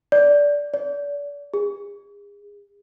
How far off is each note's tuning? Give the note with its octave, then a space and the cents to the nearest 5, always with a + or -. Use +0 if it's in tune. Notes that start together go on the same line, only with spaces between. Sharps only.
D5 -15
D5 -35
G#4 -35